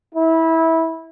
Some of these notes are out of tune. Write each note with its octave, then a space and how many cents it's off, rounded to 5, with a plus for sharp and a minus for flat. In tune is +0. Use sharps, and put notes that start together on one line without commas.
E4 -20